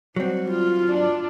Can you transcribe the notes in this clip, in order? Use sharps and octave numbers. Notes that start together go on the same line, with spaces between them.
F#3 G3 C4 F#4
F4
D4